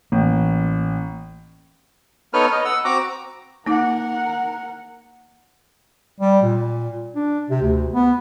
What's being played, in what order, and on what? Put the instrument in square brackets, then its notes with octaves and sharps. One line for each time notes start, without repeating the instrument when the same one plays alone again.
[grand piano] A1 [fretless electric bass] A#3
[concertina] B3 D#4 A4 B4 C#5 F6
B4 D#5
F#5 E6
C4 F#4 A#5 D6
[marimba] A#3 D#4 D6 [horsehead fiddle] A#4 F#5
[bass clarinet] G3
A#2
D4
C3
D2
B3